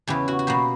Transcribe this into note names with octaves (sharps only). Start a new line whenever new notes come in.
E2 C#3 E3 G4
F#4
F#4
B2 A#3 G4